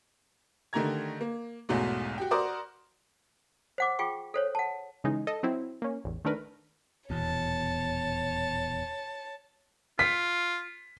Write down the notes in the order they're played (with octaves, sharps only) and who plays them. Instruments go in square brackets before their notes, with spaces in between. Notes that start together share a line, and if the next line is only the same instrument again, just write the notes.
[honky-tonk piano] D3 D#3 A3 G4 A#5 G#6
A#3
B1 E2 G#2 F#3 A3
F#4 G4 G5
F#4 A#4 C5 D5 D6 D#6
[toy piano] C5 F#5 D6
F4 G#4 G5 C#6
A4 C5 C#5
F#5 A5
[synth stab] C#3 E3 G#3 D#4 G#4
A4 D#5
F#3 C4 E4
A#3 C#4
A1 E2
D#3 A3 D4 A#4 B4
[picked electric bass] D#1 E2 B2 [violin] C#5 A5
[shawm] F4 [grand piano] B6